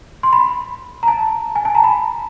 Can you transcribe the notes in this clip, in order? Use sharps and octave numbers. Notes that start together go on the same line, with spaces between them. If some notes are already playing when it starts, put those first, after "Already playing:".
C6
B5
A#5
A5
G#5
A5
A#5
B5